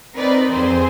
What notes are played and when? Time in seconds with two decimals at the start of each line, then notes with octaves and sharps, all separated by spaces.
0.16 C4 D#4 A#4 B4 D5
0.50 F2 C4 G#4 C5 C6